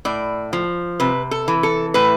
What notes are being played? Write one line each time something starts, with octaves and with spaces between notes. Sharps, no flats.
A2 D5
F3
C3 B4
A4
E3
A4
A2 B4